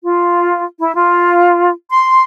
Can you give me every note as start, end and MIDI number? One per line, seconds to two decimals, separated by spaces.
0.04 0.64 65
0.79 0.94 64
0.95 1.70 65
1.90 2.23 84